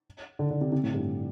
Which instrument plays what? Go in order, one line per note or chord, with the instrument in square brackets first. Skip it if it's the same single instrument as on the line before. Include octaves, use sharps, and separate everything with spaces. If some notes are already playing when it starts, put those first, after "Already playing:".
[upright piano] D3
D3
C3
C3
A2
G2